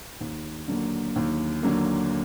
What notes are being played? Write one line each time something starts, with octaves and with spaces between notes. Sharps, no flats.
D#2
D3 F#3 A#3
D#2
D3 F#3 A#3